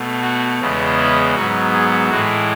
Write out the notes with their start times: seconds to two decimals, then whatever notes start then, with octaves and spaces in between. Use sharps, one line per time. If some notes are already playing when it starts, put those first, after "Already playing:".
Already playing: B2 A3
0.22 F#4
0.60 E2 C#3 G#3 B3
0.98 E4
1.35 G#2 F#3 B3 F#4
1.73 G#4
2.10 A2 E3 G#3 F#4